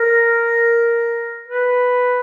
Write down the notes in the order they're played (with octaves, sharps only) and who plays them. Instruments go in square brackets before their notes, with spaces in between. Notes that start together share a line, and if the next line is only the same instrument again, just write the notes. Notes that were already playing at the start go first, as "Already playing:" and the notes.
Already playing: [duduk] A#4
B4